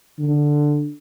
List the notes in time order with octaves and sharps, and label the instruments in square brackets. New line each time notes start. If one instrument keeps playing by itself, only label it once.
[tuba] D3